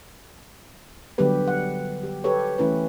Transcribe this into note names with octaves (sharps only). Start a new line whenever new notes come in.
D3 F#3 G3 B3 G4 B4
F#5
G4
G4 A4 B4 C#5
E3 A3 C#4 E4 B4